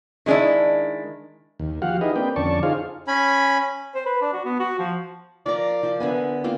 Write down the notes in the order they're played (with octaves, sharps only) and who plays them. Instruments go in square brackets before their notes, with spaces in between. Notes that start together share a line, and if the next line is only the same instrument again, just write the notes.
[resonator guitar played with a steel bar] D#3 G#3 C#4 D4 E4
[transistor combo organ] D#2
F3 F#4 G4 F5 F#5
D#4 E4 G4 G#4 B4 D#5
A#3 C4 D4 B4 G5
F2 D3 C#4 D5 A5 C#6
D#4 F4 G#4 C5 F5
[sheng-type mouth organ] C#4 G#5 B5
[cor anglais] C5
B4
D4
F#4
B3
F#4
F3
[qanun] F3 A#4 A#5 [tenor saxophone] D5
[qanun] F3 C5
[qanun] D3 E5 G#5 [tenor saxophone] B3
[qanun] A#3 C4 F4